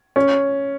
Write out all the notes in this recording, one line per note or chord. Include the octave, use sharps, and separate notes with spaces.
C#4